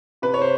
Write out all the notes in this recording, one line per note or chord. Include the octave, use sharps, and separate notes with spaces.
C3 B4
C#5
C5